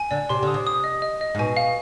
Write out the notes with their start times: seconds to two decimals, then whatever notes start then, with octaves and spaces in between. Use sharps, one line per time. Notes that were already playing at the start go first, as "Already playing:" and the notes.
Already playing: G#5
0.11 D3 D5
0.29 C3 C6
0.43 D3 D#6
0.54 C3
0.67 D#6
0.84 D#5
1.02 D#5
1.21 D#5
1.35 G#2
1.39 B2 G#5
1.57 F5